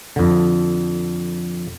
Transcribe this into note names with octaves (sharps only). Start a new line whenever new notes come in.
F2 D3